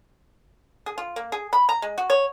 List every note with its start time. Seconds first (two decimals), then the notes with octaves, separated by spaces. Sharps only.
0.86 G#4
0.98 F4
1.16 A#3
1.32 G#4
1.53 B5
1.69 A#5
1.82 G#3
1.98 F#4
2.10 C#5